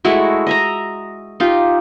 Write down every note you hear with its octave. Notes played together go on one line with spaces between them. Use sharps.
G#3 A3 E4 F#4
D#5 E5 A#5
D#4 F4 G4